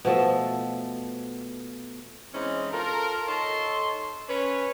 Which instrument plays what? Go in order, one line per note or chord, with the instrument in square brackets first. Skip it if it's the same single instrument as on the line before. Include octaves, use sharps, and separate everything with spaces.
[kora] B2 F3 A3 A4
[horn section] E3 G#3 C4 C#4 D#4 G4
F4 A4 A#4
D#4 A4 C#5 A5 C6
C#4 B4 C#5